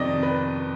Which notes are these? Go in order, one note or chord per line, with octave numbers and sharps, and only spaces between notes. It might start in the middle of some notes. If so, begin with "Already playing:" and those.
Already playing: F2 C3 D#3 D5 D#5
B4